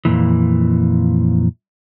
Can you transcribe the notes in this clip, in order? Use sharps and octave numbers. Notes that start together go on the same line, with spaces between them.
F2 A#2 E3